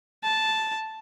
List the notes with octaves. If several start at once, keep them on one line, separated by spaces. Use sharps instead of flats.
A5